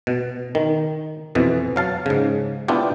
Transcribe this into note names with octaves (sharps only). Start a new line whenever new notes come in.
B2
D#3
F2 B2 E3
F#3 F5 A5
G#2 C#3
B3 D4 E4 F4 G4